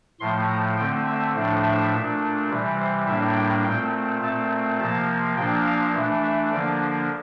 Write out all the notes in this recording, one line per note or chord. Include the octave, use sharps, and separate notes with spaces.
A2 F3 A3 C6
A#5
D3 A3 C4 G5
E5
A2 F3 A3 D4
E5
A#2 A3 D4
C3 E3 G3
C5
A2 G3 A#3 D4 E5
G5
A#2 A3 C4 G5
A#2 A3 C4 A5
C3 F3 A#3 A5
A#2 F3 A#3 D4 G5
F5
E3 A3 D4
E5
D3 F3 A#3 D4 D5